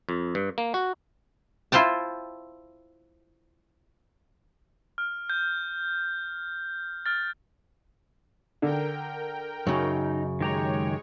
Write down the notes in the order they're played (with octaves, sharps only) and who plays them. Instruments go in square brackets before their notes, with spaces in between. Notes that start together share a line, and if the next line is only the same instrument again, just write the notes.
[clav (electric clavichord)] F2
G2
A#3
F#4
[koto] E4 F4 C5 G5 A5
[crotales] F6
G6
F6 A6
[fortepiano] D3 [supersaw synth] A#4 G5
[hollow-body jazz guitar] F#2 C#3 [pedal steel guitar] D#4
[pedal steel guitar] D#3 G4 A#5 [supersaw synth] G#3 C#5